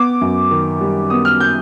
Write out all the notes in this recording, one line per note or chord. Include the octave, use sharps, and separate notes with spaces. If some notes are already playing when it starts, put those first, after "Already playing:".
Already playing: B3 D6
F#2
D#3
G3
B3 D#6
F6
G6